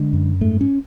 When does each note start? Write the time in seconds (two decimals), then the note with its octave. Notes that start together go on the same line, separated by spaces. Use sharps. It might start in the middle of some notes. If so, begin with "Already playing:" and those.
Already playing: D3 G#3
0.13 F#2
0.41 G#2 A3
0.61 C#4